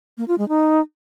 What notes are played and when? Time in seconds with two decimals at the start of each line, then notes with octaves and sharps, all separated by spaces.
0.18 A#3
0.28 F4
0.38 G#3
0.49 D#4